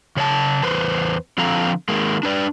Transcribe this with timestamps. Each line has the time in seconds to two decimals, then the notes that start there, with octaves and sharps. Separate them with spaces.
0.16 C#3 C#5 D5 A5
0.63 E2 B4 C5
1.38 D3 F3 C4 A4 F5 A#5
1.89 D#3 G#3 A#3
2.23 D4 B4 D5